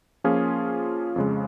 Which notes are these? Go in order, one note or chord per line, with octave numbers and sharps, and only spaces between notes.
F3 A#3 C#4 F4 G#4
F2 C#3 G#3